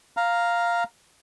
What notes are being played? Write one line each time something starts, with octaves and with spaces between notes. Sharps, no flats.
F5 A#5